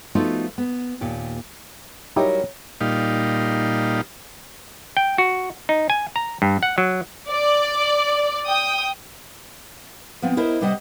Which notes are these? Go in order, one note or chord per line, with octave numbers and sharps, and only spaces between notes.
F3 A3 B3 D#4 F4 F#4
B3
D#2 A#2 G4
F#3 G3 D#4 E4 G4 A#4
A#2 G3 D#4 F5
G5
F#4
D#4
G#5
A#5
G2
F#5
F#3
D5
G5 D#6
F3 B3 C4
E4 A#4 C5 D#5 E5
C3 G3 C5 D#5 F#5